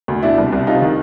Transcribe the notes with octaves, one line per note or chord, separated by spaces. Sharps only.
D2
B2 D4 E4
C2
C2
C3 D#4 F4
D#3